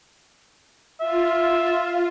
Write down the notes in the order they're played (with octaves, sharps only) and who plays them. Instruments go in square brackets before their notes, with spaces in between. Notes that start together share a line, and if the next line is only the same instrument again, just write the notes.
[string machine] F4 [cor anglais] E5